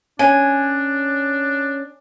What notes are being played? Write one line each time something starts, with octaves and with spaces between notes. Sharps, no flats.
C#4 D4 G#5